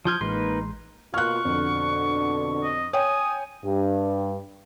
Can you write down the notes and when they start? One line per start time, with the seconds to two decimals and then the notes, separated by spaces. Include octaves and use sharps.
0.05 F3 F4 D#6 F6 G6 G#6
0.21 A1 G#3 A#3 D#4 B4 C6
1.14 B2 A#3 F4 C#6 F6 F#6
1.45 F2 B2 D3
2.63 D#5
2.93 C#5 G5 G#5 D#6
3.64 G2